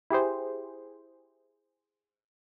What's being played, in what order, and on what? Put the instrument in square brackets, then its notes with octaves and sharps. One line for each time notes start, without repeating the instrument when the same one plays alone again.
[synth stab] E4 G4 G#4 C5